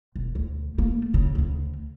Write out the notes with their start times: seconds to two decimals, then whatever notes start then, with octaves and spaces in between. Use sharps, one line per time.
0.16 E1
0.35 D2
0.78 A3 A#3
1.14 F#1 C#3
1.35 D2 C#3